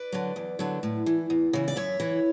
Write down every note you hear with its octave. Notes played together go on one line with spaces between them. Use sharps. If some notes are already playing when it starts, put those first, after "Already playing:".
Already playing: B4 D5
D3 F#3
E2
D3 F#3
A2
E3
E2
C#3 E3
D5
F#2 C#5 E5
E3